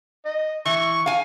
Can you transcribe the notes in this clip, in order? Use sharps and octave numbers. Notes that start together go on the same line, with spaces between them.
D#5
E3 C#6
F5 G#5